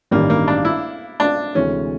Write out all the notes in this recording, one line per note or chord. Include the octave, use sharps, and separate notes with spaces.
A1 G2 D#3 G3 A#3
A#3
D4
E4
D4
D2 C3 E3 G#3 C#4